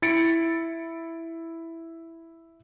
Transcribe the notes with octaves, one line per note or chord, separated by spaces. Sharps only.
E4 A6 C#7 D7